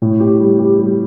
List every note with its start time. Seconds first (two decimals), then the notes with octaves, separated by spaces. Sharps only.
0.02 A2
0.20 G4
0.39 G3
0.59 G4
0.78 G3